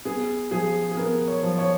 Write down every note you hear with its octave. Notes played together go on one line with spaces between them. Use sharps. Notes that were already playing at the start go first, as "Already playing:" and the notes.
B3 G#4
F3 G#4
G#4
B3 A#4
C#5
F3
C#5